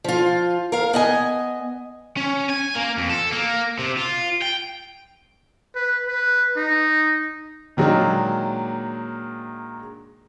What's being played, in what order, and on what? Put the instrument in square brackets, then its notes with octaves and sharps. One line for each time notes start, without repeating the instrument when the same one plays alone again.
[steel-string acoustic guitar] F3 F4
A#4 F5
B3 D#5 G#5
[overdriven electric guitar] C#4
G#5
A#3
F2
A4
A#3
C3
F4
G5
[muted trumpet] B4
B4
D#4
[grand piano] A#2 D#3 F#3 G#3 A#3 D4